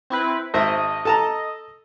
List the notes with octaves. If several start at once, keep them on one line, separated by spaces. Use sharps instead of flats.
C4 E4 B4
G#1 C5 D#5 E5
A4 A5 A#5